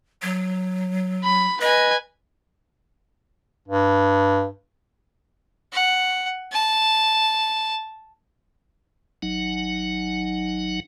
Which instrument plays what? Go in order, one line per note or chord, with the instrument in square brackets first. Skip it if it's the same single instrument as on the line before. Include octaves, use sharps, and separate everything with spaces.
[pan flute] F#3
[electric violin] B5
[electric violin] B4 G#5 [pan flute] D#5
[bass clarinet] G2
[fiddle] F#5
A5
[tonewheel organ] G#1 F#3 D#4 F#5